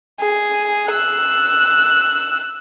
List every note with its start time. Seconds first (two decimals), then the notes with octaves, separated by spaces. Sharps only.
0.20 G#4
0.90 E6 F#6